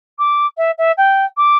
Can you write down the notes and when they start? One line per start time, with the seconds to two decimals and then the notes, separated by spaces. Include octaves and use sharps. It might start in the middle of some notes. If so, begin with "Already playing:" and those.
0.19 D6
0.57 E5
0.78 E5
0.97 G5
1.37 D6